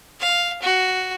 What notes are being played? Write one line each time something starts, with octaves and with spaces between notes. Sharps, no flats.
F5
F#4